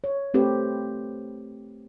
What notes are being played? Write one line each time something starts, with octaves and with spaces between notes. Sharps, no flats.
C#5
A3 C4 G4 B4